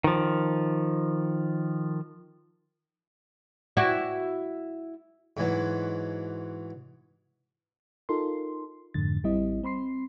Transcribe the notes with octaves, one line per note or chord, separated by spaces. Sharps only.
D#3 F3
E4 F#4 D5
G#2 E3 F#3
D#4 F4 A4 A#4 C6
F2 G#2 D3 A6
A1 G3 C4 E4 D#5
C4 B5 C6 C7